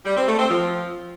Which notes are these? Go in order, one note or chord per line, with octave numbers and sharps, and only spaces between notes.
G3
C4
A3
C4
F3